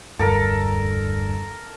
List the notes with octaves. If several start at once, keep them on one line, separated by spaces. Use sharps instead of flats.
E1 D2 G2 A4 A#4